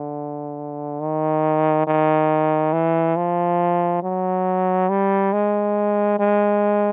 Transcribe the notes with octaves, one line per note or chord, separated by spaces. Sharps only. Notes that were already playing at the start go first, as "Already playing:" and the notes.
Already playing: D3
D#3
D#3
E3
F3
F#3
G3
G#3
G#3